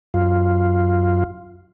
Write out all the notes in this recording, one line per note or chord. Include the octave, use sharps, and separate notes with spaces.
F#2 F4